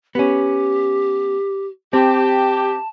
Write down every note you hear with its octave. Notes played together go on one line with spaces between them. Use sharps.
B3 C#4 G4
C4 G4 A5